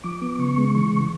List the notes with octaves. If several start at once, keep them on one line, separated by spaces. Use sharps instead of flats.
F3 D6
B3
C#3 C#6
G#3
E3 C#6
C#3